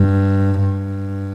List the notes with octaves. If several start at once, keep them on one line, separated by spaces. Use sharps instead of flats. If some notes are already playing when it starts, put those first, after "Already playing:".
Already playing: G2
G2